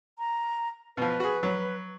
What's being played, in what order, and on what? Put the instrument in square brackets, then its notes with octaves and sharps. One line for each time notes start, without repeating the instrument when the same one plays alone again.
[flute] A#5
[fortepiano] B2 F3 [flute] B4
[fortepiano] F#4 G#4
F#3